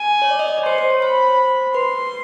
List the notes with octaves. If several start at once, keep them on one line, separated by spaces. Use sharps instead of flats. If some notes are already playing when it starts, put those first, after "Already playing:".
Already playing: G#5
C#5
D5
D#5
D5
C#5
C5 C6
C5
C#5
C5 B5
B4 C6